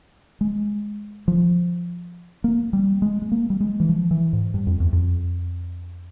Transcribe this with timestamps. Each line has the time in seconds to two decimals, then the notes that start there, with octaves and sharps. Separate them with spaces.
0.41 G#3
1.28 F3
2.44 A#3
2.73 G3
3.02 G#3
3.22 G#3
3.32 A#3
3.50 G3
3.60 G#3
3.80 E3
3.89 F3
4.11 E3
4.33 G#2
4.54 G2
4.67 F2
4.80 E2
4.93 F2